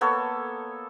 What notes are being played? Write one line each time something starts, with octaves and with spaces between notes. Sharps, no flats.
A#3 B3 A4 C#5